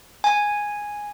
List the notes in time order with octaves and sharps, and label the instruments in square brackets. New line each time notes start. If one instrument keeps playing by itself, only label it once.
[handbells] G#5